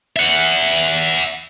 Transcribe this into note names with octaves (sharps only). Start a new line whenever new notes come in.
E5 F#5